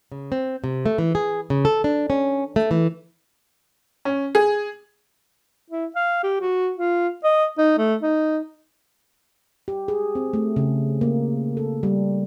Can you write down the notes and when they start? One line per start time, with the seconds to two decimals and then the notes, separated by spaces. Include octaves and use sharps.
0.12 C#3
0.32 C4
0.64 C3
0.86 A3
0.98 E3
1.15 G#4
1.50 C#3
1.65 A4
1.84 D4
2.10 C#4
2.56 A3
2.71 E3
4.05 C#4
4.35 G#4
5.70 E4
5.96 F5
6.23 G4
6.41 F#4
6.78 F4
7.24 D#5
7.58 D#4
7.78 A3
8.02 D#4
9.68 G4
9.88 G#4
10.15 C4
10.33 A3
10.56 C#3
11.01 A#3
11.57 A4
11.83 G3